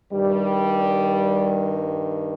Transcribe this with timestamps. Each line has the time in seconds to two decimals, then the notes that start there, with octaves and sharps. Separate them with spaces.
0.13 G2 D#3 G3